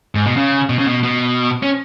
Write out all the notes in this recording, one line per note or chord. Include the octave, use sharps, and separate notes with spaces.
G#2
B2
C#3
B2
C#3
B2
B2
C#4